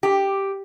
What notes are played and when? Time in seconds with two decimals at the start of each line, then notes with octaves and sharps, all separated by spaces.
0.03 G4